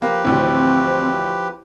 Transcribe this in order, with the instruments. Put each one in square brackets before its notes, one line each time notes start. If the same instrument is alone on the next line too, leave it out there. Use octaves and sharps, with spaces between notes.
[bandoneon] F3 G4 B4 [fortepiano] A#3
[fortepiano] A1 D2 [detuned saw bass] C4